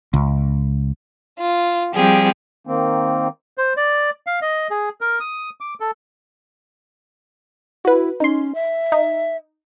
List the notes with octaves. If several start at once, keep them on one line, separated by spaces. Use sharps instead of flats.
C#2
F4
F3 G3 C4 G4 G#4
D#3 A#3 C4
C5
D5
F5
D#5
G#4
A#4
D#6
D6
A4
E4 F#4 B4
C#4 D#4 C6
E5
D#4